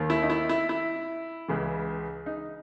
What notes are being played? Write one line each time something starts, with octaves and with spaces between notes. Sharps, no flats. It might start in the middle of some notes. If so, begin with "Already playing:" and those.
Already playing: D#2 D#3
E4
D#4
E4
E4
E4
C#2 C#3 E3
D#4